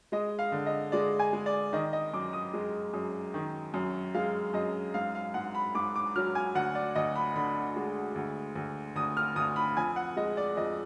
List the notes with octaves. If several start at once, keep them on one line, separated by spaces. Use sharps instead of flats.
G#3 D#5
F5
D3
D#5
G#3 D5
G#5
G#3
D5
D#3 D#5
D#5
F#2 D6
D#6
G#3
F#2
D#3
F#2
G#3 F5
F#2 D#5
G#2 F5
F5
G#2 F#5
B5
G#2 D6
D6
F#3 F6
G#5
D2 F#5
D5
D2 D#5
B5
D3 B5
G#3
D2
D2
D2 D#6
F6
D2 D#6
B5
F2 G#5
F#5
G#3 D#5
D5
F2 D#5